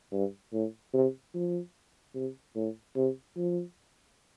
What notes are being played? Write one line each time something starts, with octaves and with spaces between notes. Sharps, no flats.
G2
A2
C3
F3
C3
A2
C3
F3